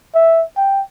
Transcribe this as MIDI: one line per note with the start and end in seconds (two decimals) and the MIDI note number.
0.15 0.43 76
0.57 0.82 79